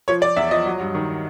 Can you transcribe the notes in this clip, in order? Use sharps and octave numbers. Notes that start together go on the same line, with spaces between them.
F3 C#5
F3 D5
E2 E5
F3 D#5
F#3
G2
D#3